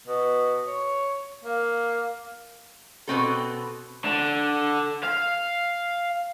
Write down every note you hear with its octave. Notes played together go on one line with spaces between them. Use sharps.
B2
C#5
A#3
B2 C4 A4
D3
F5